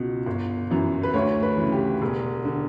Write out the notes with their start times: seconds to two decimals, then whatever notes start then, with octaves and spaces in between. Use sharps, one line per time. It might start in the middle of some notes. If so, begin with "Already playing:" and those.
Already playing: C#2 B2
0.26 G1
0.70 F#2 E3
1.03 B4
1.14 D2 C#5
1.43 B4
1.58 C#3 E3
1.72 G4
2.02 E1
2.45 D3